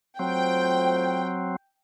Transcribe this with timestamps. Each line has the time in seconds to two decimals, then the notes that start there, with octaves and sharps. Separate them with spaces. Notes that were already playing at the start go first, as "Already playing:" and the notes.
0.19 F#3 A3 C4 F4 C5 G5